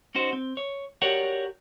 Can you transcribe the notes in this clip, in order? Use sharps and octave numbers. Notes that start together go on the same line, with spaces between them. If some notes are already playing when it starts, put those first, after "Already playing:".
C#4 D#4 F#4 C5
C4
C#5
F#4 G4 A#4 C#5 D5 F#5